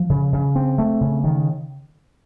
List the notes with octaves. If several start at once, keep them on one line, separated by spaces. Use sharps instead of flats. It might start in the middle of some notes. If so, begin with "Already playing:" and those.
Already playing: F3
C#3
C#3
C4
A3
C#3
D#3